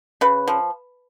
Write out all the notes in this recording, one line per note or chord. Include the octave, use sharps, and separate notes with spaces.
C#3 B4
F3